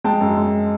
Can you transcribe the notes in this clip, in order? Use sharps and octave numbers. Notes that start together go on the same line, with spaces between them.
G#3 G5 A5
F#2
G#3